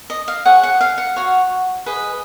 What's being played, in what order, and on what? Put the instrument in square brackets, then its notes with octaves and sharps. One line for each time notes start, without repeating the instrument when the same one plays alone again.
[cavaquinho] D#5
F5
G#4 C#5 F#5
F#5
F5
F#5
F#4 C#5
G#4 B4 D#5